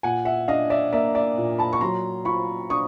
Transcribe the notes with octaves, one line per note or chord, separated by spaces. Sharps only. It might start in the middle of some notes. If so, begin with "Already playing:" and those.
A#2 F#5 G#5
E5 F#5
D4 D#5 F5
D5 E5
A#3 D5 E5
D5 E5
A#2
A5 B5
C#6
F#3 A#5 C6
F4 B5 C#6
D4 C#6 D#6